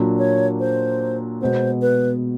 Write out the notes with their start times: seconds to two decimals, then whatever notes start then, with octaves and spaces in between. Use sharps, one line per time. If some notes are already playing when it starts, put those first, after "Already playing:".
Already playing: A#2 F#3 A#3 D4
0.18 C#5
0.60 C5
1.41 B2 G#3 B3 C5
1.82 B4